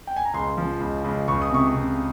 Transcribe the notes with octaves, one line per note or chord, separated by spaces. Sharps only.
G5
G#5
A#5
C#2 C6
F3
C#2
C#2
C#2 C#6
D#6
C3 C#6
C3